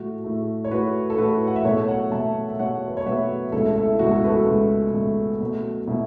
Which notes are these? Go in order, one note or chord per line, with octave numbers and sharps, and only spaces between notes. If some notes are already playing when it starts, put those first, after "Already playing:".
Already playing: A2 A3 F#4
A2 A3
C#5
A2 A3 F#4 B4
A4
A2 A3 F#4 B4
F#5
E5
B2 F#3 A3 A4 C#5
C#5 F#5
B2 F#3 A3 E5 A5
E5
B2 F#3 A3 C#5 F#5
B4
C#5
B2 F#3 A3 B4 E5
C#2 B2 A3 E4 A4
E4 A4
E4
C#2 B2 A3 F#4
E4 A4
F#4 B4
A4
F#4
C#2 B2 A3
C#2 B2 A3
B2 F#3 A3
B2 F#3 E4